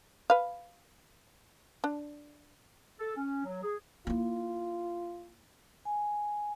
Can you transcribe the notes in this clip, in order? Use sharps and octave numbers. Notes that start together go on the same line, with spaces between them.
B4 F5
D4
A4
C#4
F#3
G#4
A#3 E4 F4
G#5